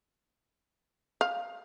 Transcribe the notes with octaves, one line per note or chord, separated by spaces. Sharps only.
F5